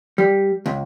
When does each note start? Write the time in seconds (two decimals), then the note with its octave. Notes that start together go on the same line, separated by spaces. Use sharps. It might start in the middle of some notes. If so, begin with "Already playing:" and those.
0.18 G3
0.66 C#2